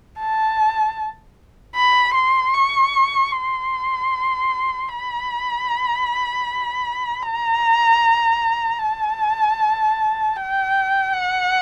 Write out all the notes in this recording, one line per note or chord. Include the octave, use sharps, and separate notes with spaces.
A5
B5
C6
C#6
C6
B5
A#5
A5
G5
F#5